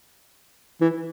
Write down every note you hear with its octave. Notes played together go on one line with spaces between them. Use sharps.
E3